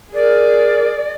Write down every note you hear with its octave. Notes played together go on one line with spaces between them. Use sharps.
G#4 A#4 D5